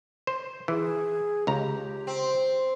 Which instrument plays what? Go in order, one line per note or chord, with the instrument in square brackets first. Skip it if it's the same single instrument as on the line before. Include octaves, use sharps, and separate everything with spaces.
[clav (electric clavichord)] C5
[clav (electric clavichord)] E3 [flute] G#4
[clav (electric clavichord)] C#2 A#5 [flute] G4
[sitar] C4